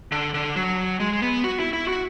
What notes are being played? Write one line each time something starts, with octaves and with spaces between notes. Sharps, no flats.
D3
D3
F#3
G#3
B3
F#4
E4
E4
F#4